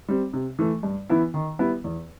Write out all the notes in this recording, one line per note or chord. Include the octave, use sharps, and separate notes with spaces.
G3 C4
C3
E3 A3
G2
E3 B3 E4
D#3
G3 B3 E4
E2